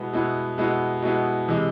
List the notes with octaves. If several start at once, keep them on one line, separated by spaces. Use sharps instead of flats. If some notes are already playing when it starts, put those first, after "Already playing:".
Already playing: B2 G#3 B3 E4
B2 G#3 B3 E4
B2 G#3 B3 E4
B2 G#3 B3 E4
C3 E3 G#3